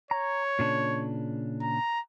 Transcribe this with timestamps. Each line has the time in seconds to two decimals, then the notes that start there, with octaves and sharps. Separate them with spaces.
0.11 C#5 A#5
0.59 A#2 C#3 D4
1.62 A#5